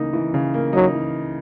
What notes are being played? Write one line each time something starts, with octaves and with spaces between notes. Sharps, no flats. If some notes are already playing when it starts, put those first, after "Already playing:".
Already playing: C#3 E3 A#3 D#4
E3
C#3
A#3
F#3 D#4
E3